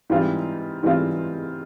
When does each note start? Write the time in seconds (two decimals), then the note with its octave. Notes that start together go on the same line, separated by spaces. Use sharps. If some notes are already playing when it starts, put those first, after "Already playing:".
0.10 G#2 E3 G3 C4 F4
0.83 G#2 E3 G3 C4 F4